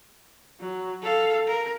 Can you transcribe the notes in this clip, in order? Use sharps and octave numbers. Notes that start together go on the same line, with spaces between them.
F#3
A4 F5
A#4